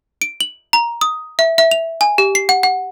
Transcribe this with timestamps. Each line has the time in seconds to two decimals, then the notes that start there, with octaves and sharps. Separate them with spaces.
0.22 D7
0.41 F#7
0.73 A#5
1.01 D#6
1.39 E5
1.58 E5
1.71 F7
2.01 G#5
2.18 G4
2.35 C7
2.49 F#5
2.63 F#5